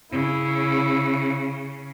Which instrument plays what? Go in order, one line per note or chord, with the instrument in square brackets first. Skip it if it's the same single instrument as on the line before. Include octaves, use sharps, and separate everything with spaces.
[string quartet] C#3 [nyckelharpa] E4